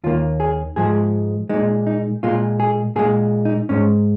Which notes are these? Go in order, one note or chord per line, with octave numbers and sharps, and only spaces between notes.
D#2 D#3 A#3 F4
G#4
G#2 F3 G#3 G#4
A#2 G#3 D#4
D#4
A#2 G#3 F4
G#4
A#2 G#3 G#4
D#4
G#2 G#3 C#4